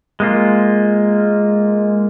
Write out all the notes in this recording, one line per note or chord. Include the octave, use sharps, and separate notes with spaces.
G#3 A#3 F4